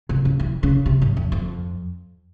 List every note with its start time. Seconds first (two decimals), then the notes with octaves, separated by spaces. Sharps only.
0.09 C3
0.25 C#3
0.40 E3
0.63 C#3
0.86 C3
1.02 G#2
1.17 F2
1.32 F2